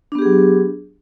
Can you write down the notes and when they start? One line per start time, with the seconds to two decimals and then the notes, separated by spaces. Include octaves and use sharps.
0.12 D4
0.15 B3
0.19 G4
0.22 G#4
0.25 F#3